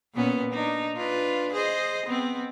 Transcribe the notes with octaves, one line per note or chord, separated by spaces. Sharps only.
A#2 B3 C#4
D4 D#4
D4 F4 B4
G#4 C5 D#5
B3 C4